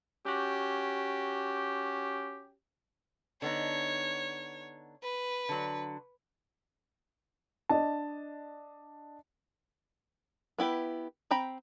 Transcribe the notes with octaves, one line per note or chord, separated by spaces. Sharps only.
C#4 F#4 G4
D3 B3 D#4 C#5
B4
D3 F#3
D4 D#5 A5
B3 E4 G4 B4
C4 G5 A#5 B5